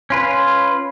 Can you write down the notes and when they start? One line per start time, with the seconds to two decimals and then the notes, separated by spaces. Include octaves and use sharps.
0.10 C#4 F4 B4